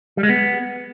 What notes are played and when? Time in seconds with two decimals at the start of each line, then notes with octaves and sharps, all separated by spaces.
0.17 G3
0.23 G#3
0.29 B3